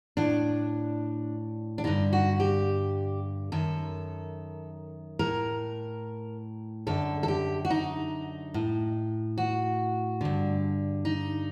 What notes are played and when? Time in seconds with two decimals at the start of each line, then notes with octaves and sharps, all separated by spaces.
0.17 A2 D4
1.78 D4
1.84 G2 D3 D#4
2.13 F#4
2.40 G4
3.52 F#2 D#3 A4
5.19 A2 A#4
6.87 F#2 D3 A4
7.23 A4
7.28 G4
7.65 F#4
7.70 D#4
8.54 A2
9.38 F#4
10.21 G2 D3
11.05 D#4